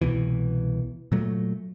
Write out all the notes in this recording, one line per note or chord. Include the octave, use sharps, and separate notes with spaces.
C2 B2 E3
A#2 F#3 A3